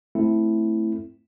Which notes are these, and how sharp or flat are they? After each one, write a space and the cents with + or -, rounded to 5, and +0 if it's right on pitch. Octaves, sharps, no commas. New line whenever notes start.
A3 +5 C4 +0 E4 +0